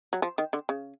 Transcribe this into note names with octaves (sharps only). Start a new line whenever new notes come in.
F#3
F3
D#3
D3
C#3